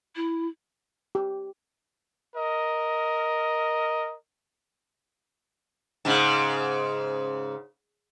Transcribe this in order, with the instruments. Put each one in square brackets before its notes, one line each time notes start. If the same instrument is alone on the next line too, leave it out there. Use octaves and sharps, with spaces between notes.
[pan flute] E4
[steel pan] G4
[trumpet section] A#4 D#5
[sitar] G#2 C#3